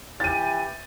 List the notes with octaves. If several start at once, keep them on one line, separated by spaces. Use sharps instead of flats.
E3 G4 A6 D#7